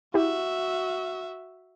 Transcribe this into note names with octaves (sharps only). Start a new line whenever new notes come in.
E4 F#4 G4 E5